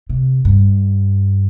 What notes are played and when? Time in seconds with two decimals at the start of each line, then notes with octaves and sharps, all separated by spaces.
0.09 C3
0.45 G2